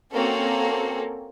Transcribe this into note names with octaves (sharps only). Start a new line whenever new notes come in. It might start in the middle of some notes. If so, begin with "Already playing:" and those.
A#3 C4 C#4 F#4 A4